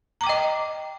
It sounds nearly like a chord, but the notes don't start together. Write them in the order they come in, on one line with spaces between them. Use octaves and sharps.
A#5 D6 G5 D#5